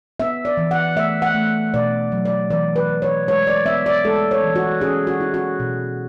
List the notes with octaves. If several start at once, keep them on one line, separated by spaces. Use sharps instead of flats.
B3 E5
D5
E3
F#5
A3 E5
F#5
A3
B2 D5
F#3
D5
E3 D5
B4
E3
C#5
G#3 C#5
D5
B3 E5
D5
G#3 A4
C#5
E3
F#4
C#4 G#4
F#4
E4
F#4
B2